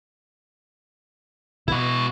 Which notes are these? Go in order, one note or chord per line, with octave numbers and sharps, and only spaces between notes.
B2 E4 F#4